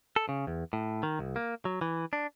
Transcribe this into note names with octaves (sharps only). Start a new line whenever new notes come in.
A4
C#3
E2
A2
D#3
C2
A#3
F#3
E3
D4